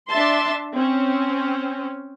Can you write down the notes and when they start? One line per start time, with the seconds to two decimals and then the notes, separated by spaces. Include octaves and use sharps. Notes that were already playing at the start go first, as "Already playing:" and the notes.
0.10 D4 E5 A5 C6
0.74 C4 C#4